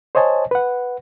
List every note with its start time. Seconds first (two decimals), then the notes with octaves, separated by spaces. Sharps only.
0.15 C5 C#5 D#5 G#5 A5
0.51 B4 F#5